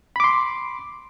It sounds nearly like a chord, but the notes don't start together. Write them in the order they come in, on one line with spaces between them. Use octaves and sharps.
B5 D6 C6